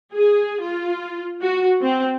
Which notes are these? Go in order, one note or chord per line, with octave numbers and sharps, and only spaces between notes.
G#4
F4
F#4
C4